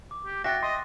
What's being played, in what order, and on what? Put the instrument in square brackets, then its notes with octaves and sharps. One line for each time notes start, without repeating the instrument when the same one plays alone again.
[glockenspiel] D6
[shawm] G4
[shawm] F#4 [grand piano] E5 G5 [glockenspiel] A6 A#6
[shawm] D#5 [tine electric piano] C6